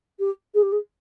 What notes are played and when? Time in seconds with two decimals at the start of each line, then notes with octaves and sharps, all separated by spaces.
0.19 G4
0.54 G#4
0.62 G4
0.72 G#4